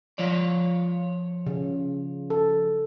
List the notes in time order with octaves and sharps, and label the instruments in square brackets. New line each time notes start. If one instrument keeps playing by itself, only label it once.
[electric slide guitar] F3 C#5 D5
[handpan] C#3
A4